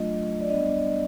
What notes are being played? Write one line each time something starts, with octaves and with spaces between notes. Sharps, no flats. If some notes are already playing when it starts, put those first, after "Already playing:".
Already playing: F#3 A3 D4 F4 D#5
D5
G3 B3 D4 D#5